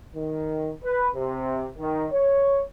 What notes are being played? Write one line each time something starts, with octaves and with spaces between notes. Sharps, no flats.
D#3
B4
C3
D#3
C#5